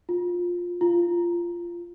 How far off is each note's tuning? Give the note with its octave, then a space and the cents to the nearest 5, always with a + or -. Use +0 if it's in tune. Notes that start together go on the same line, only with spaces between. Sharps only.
F4 +15
F4 -15